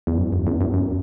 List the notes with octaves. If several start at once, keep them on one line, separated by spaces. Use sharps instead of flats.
E2
F#2
F#2
E2
F#2
F#2